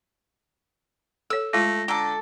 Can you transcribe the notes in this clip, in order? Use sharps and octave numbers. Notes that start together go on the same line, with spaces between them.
A4 C#5 E6
G#3 A3 F4 A#6
D3 A4 A#5 D6